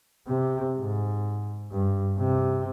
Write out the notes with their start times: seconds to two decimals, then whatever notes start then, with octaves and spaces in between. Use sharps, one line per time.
0.27 C3
0.79 G#2
1.72 G2
2.18 C3